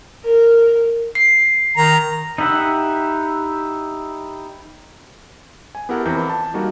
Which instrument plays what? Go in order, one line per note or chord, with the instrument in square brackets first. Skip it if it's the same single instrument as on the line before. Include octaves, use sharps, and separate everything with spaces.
[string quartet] A#4
[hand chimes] C7
[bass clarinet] D#3 [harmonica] A#5
[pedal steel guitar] D#4 E4 G4 E5 F#5
[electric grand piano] G#5
B3 E4 G4 A4 A#4 F#5
F2 E3 A#5 G6
A5
G3 A#3 D#4 F#4 A4